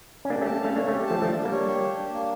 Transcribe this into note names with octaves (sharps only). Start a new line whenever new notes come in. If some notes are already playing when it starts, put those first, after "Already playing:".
C#4
A#3 D4 G4
A3 C#4
A5
A3 C#4 F5
A#3 D4 C#5
A3 C#4
G4
F3 A3 A5
F3 A3 D4
D4
G3 A#3
C#5
G4
D4
D4
A#3